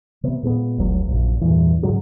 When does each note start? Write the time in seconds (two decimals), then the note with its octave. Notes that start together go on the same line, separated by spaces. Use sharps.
0.23 C3 B3
0.43 A#2 G#3 A3 B3
0.78 F1 C#2 F#3
1.08 A#1 F#2
1.41 E2 G2 A#2 E3
1.82 G#2 C#3 F#3 G#3